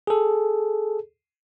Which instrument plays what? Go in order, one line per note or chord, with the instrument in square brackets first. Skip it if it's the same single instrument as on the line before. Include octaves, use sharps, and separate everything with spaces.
[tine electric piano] G#4 A4